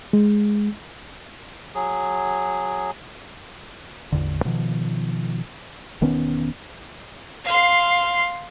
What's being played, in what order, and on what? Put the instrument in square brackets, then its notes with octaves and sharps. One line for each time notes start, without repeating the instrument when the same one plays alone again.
[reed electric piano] G#3
[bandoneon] F#3 G#4
[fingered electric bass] A1 E2 D3
B2 D#3 F3
E1 D#3 B3 C#4
[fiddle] F5 C6